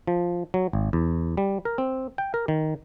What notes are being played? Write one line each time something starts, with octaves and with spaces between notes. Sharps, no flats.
F3
F#3
G#1
E2
G3
A#4
C4
G5
A#4
D#3